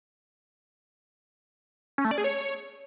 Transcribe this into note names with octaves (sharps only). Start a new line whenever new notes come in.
C#4
A3
D5
G#4
C#5